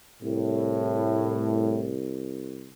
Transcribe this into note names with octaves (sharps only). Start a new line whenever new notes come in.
C2 A2